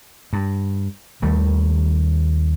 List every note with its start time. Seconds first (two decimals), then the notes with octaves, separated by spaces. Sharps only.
0.33 G2
1.22 D#2 D#3 G3 A3